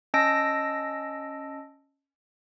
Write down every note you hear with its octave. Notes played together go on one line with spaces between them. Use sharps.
C#4 D#5 A5 E6 A#6 D7